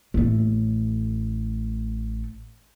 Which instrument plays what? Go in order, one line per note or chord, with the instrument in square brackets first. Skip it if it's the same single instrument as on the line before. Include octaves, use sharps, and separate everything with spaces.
[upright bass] A1 A3